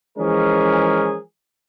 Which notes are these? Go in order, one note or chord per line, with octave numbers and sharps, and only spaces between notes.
E3 F3 G#3 C#4 G#4 A#4